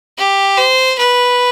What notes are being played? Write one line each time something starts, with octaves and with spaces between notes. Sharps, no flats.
G4
C5
B4